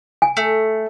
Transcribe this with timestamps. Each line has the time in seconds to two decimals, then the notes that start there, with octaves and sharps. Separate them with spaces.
0.22 G#5
0.37 A3